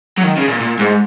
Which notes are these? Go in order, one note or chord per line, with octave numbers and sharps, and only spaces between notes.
F#3
D#3
C#3
A#2
A#2
G#2